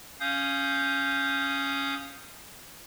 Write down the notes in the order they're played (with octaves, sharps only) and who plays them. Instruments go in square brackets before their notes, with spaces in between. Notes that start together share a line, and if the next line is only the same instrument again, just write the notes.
[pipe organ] C#4 F5 D#6 G6